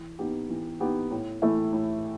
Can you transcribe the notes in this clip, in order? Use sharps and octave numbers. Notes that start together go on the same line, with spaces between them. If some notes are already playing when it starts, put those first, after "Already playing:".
Already playing: E3
B3 D#4 G4
E3
B3 D#4 G4
A2
E3 A3 E4
A2